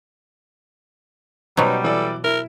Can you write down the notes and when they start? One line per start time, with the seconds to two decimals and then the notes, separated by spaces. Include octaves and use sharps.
1.57 B2 F#3 G3 C#4 D#4 B4 C5
1.84 E3 A4 D5
2.24 E4 A#4